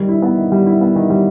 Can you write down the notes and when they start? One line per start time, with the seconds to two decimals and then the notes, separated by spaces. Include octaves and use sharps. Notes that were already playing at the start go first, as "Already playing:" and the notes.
Already playing: D#3 G3
0.09 E4
0.22 B3
0.37 D#3
0.52 G3
0.66 E4
0.81 B3
0.96 D#3
1.10 G3